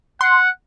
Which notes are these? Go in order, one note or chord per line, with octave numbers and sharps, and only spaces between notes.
F#5 C6